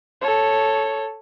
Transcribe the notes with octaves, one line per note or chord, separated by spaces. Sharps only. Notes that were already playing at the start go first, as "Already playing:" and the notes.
A4 C#5